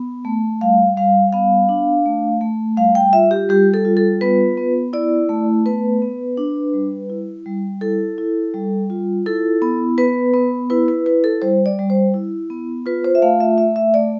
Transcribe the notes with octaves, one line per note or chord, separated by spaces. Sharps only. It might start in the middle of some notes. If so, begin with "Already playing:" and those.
Already playing: B3
A3
G3 F5
G3 F5
B3 F5
D4
A3
A3
G3 F5
G5
F4 E5
G4
G3 G4
A4
F4
A4
B3 B4
B3
E4 D5
A3
B3 B4
B3
D4
G3
E4
G3
E4 A4
E4
G3
F4
E4 A4
B3
B3 B4
B3
E4 B4
B4
E4 B4
A4
G3 C5
D5
G3
C5
E4
B3
F4 B4
C5
E5
A3 F5
E5
A3 E5
E5
A3 D5